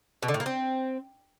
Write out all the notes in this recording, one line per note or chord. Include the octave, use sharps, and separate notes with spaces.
B2
D3
A2
A#3
C4